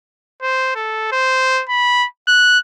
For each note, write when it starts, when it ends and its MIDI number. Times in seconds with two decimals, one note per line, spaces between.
0.42 0.72 72
0.75 1.11 69
1.12 1.63 72
1.69 2.06 83
2.28 2.58 90